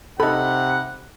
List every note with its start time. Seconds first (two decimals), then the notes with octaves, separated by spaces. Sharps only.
0.20 C3 D#4 A4 F#5 B5